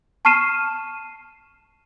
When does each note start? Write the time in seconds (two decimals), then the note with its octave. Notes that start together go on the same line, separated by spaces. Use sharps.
0.25 A5 C#6 F6 C7 D#7 E7